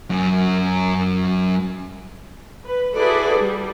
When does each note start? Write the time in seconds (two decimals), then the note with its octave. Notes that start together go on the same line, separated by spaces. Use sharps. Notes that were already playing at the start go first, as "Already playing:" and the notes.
0.10 F#2 C#4
2.65 B4
2.94 E4 F#4 G#4 A4 B4 D5
3.38 G3